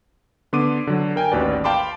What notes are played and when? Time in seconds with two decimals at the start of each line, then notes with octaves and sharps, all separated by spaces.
0.53 D3 B3 C6 D6 D#7
0.87 D3 F#3
1.16 A#4 G5 G#5
1.32 A1 D#2 F#4 B4 D5
1.64 F5 G5 A5 B5 C6 D6